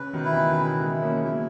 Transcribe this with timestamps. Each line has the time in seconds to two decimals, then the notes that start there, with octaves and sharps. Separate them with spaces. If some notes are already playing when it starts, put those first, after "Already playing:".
Already playing: C#3 B4
0.13 B2 D#3
0.25 E4
0.32 E3
0.36 B2 D#3
0.53 B2
0.57 C#3 E4
0.80 G#3 B3
0.91 E4
1.02 A#3 C#4
1.24 F#3 A#3 E4